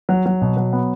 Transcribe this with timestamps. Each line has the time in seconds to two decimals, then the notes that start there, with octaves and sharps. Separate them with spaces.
0.09 F#3
0.26 F#3
0.42 B2
0.57 F#3
0.73 B3